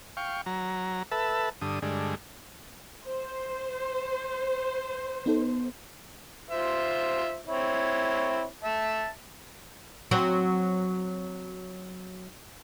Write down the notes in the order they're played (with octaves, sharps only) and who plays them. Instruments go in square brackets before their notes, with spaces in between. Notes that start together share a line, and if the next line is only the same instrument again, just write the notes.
[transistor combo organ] F5 G5 C#6
F#3 A#5
A4 B4 E5 A5
G2 D3 D#6
G2 D3 G#3
[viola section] C5
[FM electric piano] B3 D#4 A4
[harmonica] F4 C5 E5
C4 E4 C#5
E5 A5
[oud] F#3 C4 F#4